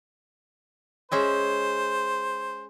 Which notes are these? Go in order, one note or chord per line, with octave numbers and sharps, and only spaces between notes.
G#3 C#4 C5 E5